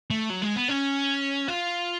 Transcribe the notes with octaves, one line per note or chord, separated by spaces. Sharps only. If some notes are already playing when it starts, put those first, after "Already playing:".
A3
F#3
G#3
B3
C#4
F4